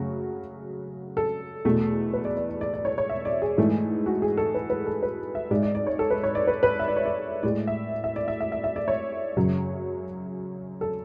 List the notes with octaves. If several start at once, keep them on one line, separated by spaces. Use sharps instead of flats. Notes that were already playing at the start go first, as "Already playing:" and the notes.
Already playing: F#2 C#3 F#3 A3 F#4
A4
E2 B2 A3
B4
D5
D5
D5
D5
D5
C#5
C#5
E5
D5
G#4
G#2 E3 A3
F#4
G#4
A4
B4
B4
A4
B4
E5
G#2 G#3 D5
D5
D5
C#5
A4
B4
C#5
D5
B4
B4
E5
D5
C#5
D5
A2 G#3 D5
E5
E5
D5
E5
E5
E5
E5
D5
C#5
F#2 C#3 F#3
A4